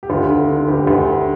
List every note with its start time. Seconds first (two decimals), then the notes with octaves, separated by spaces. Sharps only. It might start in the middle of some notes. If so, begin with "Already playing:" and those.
0.03 G4
0.10 D2 F4
0.30 D3
0.48 D3
0.68 D2 G4
0.87 D2
1.07 D3